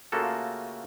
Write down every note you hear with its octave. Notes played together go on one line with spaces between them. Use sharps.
C#3 A3 A#3 F4 F#4 A4